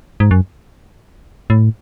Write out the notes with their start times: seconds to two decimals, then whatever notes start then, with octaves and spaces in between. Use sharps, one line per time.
0.20 G#2
0.31 F#2
1.50 A2